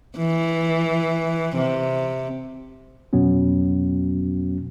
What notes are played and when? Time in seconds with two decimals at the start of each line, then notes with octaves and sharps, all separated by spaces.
0.17 E3
1.57 C3
3.13 F2 B2 F#3 B3 C#4